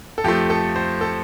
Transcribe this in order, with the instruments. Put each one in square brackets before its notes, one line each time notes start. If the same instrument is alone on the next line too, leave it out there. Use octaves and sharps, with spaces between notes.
[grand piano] A4
F2 F3 A3 G4
A4
C5
A4